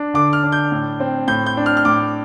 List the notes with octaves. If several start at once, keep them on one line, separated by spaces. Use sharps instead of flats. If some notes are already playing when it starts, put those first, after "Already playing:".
Already playing: D4
D3 D6
F6
D4
G6
A2
C4
A2 G6
G6
D4
F6
F6
A2 D6